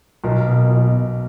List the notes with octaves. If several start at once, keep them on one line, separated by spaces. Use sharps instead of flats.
B1 A#4
B2
B1
B2